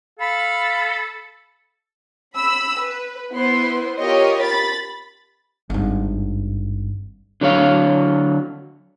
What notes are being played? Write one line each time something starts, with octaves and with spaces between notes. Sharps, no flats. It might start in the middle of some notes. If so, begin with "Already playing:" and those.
A4 F5 B5
B5 E6
B4
B3 E4 B4 C5 C6
F4 G4 A#4 C#5 D#5
B5 A6
G#1 G2
D3 F#3 C#5 F5